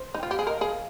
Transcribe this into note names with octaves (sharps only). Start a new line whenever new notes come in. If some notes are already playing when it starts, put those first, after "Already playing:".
Already playing: C5
D#4
F4 G5
G4 F5
G#4
A#4 D#5
G#4 F5